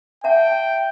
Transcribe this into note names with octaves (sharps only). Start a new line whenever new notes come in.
E5 F#5 G5 A5